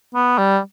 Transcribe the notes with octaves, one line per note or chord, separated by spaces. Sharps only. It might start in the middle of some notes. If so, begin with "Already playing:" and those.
B3
G3